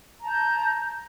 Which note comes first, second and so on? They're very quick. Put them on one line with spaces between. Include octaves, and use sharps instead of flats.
A#5 A5 G6